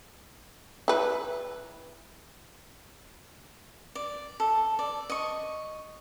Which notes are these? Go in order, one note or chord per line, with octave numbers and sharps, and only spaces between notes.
E4 B4
D5
A4
D5
D#5 C#6